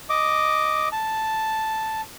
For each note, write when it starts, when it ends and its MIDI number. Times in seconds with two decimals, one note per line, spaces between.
0.09 0.89 75
0.09 0.89 86
0.92 2.01 81